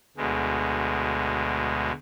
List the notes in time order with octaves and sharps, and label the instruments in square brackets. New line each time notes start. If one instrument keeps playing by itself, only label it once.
[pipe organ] D2 B2 G#3